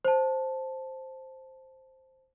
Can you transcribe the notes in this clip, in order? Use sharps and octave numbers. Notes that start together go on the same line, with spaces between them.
C5 A5